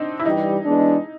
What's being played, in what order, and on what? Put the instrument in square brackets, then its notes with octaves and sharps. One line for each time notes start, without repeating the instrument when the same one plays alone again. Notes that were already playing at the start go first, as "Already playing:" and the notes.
Already playing: [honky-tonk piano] C4 D4 D#4
E4
[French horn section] G2 E3 G3 [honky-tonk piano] D#4
[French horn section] E3 G#3 B3 D4